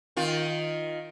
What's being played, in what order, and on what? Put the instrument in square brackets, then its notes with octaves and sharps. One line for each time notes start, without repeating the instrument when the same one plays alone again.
[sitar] D#3 F4